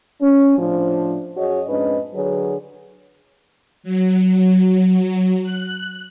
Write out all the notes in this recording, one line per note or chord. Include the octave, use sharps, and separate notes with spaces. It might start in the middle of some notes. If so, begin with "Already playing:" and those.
C#4
A2 F3 D4
F#2 F#4 G#4 C#5 D#5
F2 G#2 C#4 D4 B4 D#5
D3 F#3 G#4 B4 C#5
F#3
F#6